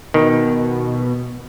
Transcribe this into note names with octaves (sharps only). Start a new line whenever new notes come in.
B2 D#3